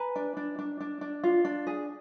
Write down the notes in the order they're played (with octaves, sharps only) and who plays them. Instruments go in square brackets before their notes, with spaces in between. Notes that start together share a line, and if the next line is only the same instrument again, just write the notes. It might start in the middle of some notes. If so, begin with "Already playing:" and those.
Already playing: [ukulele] B4 G#5 A#5
D4
D4
D4
D4
D4
F4
D4
G#4